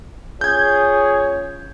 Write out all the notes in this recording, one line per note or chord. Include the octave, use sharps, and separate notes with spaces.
C#4 F4 G#4 C#5 G6 G#6